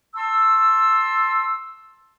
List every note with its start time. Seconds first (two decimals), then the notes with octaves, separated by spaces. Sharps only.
0.15 A5 C6 E6